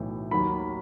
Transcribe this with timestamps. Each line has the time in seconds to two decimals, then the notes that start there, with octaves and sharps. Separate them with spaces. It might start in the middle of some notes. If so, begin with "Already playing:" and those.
Already playing: B1 A2 E3
0.31 D#2 D#3 F#3 B5